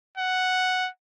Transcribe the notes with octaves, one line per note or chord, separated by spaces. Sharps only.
F#5